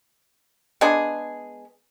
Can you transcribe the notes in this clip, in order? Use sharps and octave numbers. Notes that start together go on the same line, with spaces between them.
G#3 B3 D4 G#4